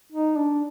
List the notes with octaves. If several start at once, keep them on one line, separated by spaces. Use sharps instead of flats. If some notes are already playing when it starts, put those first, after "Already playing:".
D#4
D4